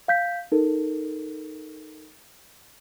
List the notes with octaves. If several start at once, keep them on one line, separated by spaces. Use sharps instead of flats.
F5 G6 B6
D#4 A4 A#4